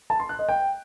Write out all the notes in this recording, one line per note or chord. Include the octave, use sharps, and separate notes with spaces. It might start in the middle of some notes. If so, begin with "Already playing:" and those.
A5
C6
F#6
D#5
G5